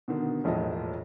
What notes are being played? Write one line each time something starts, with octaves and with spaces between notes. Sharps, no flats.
B2 D3 D#3
E1 A#1 A2 F3 D#5